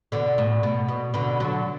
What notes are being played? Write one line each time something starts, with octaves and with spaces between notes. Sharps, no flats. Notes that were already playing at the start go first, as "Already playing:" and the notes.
B2 D3
A2
B2
B2
B2 D3
D3 F#3